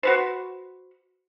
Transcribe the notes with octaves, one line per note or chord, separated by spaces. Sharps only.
F#4 B4 C5